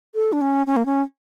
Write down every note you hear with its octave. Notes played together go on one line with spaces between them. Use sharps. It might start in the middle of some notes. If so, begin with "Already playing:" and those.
A4
D4
C#4
C#4
A#3
C#4